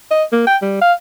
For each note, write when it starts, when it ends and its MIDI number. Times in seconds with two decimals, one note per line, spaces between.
0.11 0.24 75
0.32 0.46 58
0.47 0.57 79
0.62 0.81 55
0.82 0.93 77